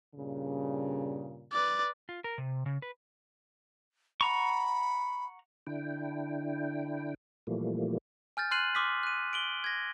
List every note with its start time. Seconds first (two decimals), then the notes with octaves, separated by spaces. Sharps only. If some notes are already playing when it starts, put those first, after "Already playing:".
0.15 G2 A#2 C#3
1.53 B4 D5
2.09 F4
2.24 A#4
2.38 C3
2.66 C#3
2.82 B4
4.21 F#5 A#5 B5 C#6
5.67 D3 D4 E4 G5
7.47 A#2 E3 F3 G3 A3 A#3
8.37 G#5 F6 G6 A6
8.51 C6 F6 F#6 C7 D#7 F#7
8.75 C6 D6 D#6 F6 B6
9.03 F#6 D#7
9.33 D7 F#7 G7
9.64 G#6 A#6